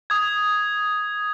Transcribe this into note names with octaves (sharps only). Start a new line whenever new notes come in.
D#6 G#6